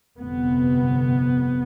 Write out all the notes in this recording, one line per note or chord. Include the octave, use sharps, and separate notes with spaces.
G1 F2 C3 B3